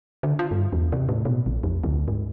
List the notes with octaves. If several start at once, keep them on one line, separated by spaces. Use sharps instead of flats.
D3
F4
G2
E2
C3
A2
B2
A#1
F2
D2
G#2